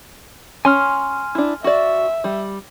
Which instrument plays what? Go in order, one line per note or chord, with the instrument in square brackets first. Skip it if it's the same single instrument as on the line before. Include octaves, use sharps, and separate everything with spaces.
[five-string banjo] C#4 [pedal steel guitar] G#5 C6 F6
[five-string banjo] D4 E4
[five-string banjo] F#4 D5 [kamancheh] E5
[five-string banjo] G3